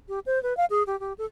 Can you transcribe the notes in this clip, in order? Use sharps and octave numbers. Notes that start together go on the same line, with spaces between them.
G4
C5
B4
F5
G#4
G4
G4
A4